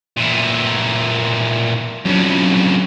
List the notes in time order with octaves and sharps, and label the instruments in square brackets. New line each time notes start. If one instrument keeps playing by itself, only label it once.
[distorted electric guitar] A#2 E3
[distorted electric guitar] F2 C#3 [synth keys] F#3 D4